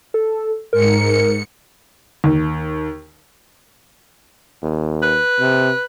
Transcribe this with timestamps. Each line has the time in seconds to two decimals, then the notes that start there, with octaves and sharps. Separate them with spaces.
0.14 A4
0.73 G#2 A#4 C#7
2.24 D#2
4.63 D#2
5.03 B4
5.40 C3